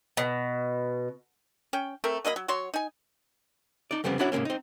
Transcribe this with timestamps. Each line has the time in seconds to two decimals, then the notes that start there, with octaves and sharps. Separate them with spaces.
0.17 B2
1.73 C#4 C#5 G5
2.04 A3 C4 A#4 E5
2.25 F#3 A#3 D#5 B5
2.36 F#3
2.48 F#3 F#4 C#5 C6
2.74 D#4 G#5
3.91 D#4 D5
4.04 F2 C#3 G3 B3 C4
4.19 C#4 D4 E4 F#4 C#5 F#5
4.32 G#2 C3 F#3 A#3 C#4
4.45 C4 D#4